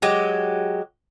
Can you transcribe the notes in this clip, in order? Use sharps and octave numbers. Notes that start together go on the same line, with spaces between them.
F#3 G#3 G4